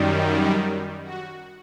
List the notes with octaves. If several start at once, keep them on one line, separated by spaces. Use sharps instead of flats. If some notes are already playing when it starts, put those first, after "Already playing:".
Already playing: F#2 D#3 G3
F#4